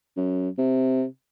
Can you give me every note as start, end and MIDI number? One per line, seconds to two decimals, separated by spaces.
0.17 0.49 42
0.58 1.04 48